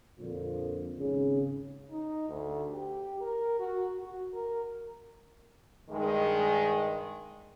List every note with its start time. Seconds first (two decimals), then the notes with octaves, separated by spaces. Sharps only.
0.18 F2 A#2 D3 F3
0.99 G#1 C#3
1.90 D#4
2.29 D2
2.71 G4
3.21 A#4
3.59 F#4
4.03 F#4
4.34 A#4
5.90 G2 D#3 G#3